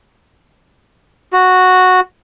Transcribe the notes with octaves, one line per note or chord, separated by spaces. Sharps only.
F#4